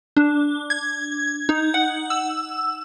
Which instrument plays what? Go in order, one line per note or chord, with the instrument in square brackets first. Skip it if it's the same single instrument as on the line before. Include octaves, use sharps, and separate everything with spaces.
[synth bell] D4
G#6
D#4
F#5
E6